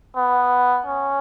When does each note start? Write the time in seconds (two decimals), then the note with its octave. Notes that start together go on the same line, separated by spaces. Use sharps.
0.16 B3
0.86 C#4